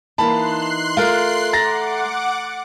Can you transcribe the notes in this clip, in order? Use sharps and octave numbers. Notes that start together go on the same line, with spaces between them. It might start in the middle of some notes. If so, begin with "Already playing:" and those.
E3 A#3 D#4 A5 B5 C6 F#6 C7
A3 F4 A#4
F#5 A#5 D6 A6 A#6